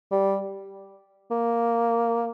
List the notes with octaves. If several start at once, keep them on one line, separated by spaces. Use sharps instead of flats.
G3
A#3